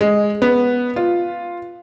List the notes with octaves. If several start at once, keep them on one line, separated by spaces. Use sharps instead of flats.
G#3
B3
F4